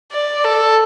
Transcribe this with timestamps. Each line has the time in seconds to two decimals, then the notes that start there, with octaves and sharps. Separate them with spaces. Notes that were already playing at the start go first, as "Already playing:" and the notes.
0.12 D5
0.44 A4